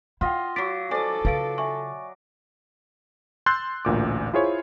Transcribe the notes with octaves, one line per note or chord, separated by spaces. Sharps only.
E4 F4 D#5 F#5 G5
F#3 D6 A6 B6 D7
A4 C5 D5 D#5 F5 G#5
C#3 F4 B4 F5 D7
E5 G#5 C#6
C6 E6 F#6 G6 A6 C7
A1 D2 A#2 D6
E4 F4 G#4 C5 C#5